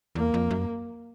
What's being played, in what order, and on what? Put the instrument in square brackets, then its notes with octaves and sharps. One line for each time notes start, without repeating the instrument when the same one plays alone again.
[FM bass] E2 [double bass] A#3
[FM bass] F2
F#2